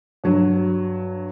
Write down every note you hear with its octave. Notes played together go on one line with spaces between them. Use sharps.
G2 F#3